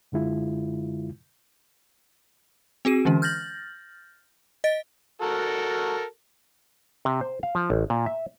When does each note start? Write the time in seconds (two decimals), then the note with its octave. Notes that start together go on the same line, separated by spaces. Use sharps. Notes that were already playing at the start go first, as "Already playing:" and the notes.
0.12 F#2 D3 G#3 E4 F4
2.85 C4 F#4 G#4 D#7
3.05 D3 E3 G#3 C#4
3.22 F6 G6 A6 A#6 F#7
4.64 D#5 A6 D7
5.22 F#4 A4 A#4
7.05 C3
7.21 C5
7.43 F5
7.55 F3
7.70 A1
7.90 A#2
8.06 E5